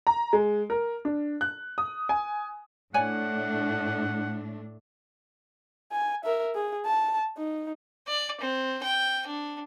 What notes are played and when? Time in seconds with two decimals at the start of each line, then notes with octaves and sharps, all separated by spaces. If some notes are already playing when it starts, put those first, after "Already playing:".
0.07 A#5
0.33 G#3
0.70 A#4
1.05 D4
1.41 F#6
1.78 D#6
2.09 G#5
2.94 A2 A3 D4 C#5 D5 F#5 G#5
5.92 G#5
6.25 A#4 E5
6.55 G#4
6.86 A5
7.38 D#4
8.07 D5
8.40 C4
8.83 G5
9.27 D4